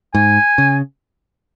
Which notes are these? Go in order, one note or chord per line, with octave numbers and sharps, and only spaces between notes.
G#2 G#5
C#3